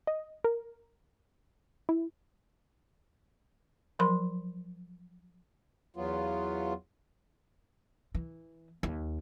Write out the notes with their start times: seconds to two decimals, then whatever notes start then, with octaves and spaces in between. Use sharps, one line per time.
0.07 D#5
0.44 A#4
1.89 E4
3.99 F3 F#3 A#4 B5 C6
5.96 E2 F#3 B3 F4
8.15 E3
8.83 D#2